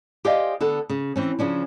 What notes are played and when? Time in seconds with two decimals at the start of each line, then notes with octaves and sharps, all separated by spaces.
0.25 G4 C5 D5 D#5 F5 G#5
0.61 D3 B3 A4
0.90 C#3
1.16 E3 C4 C#4
1.39 C#3 F3 C#4 D4